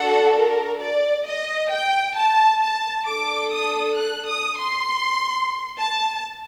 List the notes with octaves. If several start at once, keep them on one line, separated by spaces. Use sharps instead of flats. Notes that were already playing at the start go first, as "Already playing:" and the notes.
Already playing: D4 F#4 A4 F#5
A#4
D5
D#5
G5
A5
A5
D4 A4 D6
D#6
F#6
D#6
C6
A5